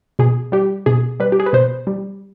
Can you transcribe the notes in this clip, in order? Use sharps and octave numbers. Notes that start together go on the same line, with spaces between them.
B2 G#4
G3 G4
B2 G#4
G3 B4
G4
G#4
B4
B2 C5
G3